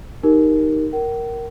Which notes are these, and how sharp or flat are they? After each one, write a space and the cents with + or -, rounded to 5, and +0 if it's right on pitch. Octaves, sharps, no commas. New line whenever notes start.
D#4 +0 G4 +0 A#4 +0
A#4 +0 G5 -45